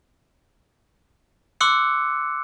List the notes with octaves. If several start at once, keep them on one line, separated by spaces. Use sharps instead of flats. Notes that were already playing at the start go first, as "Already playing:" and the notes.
C6 D6 E6 F#6 C#7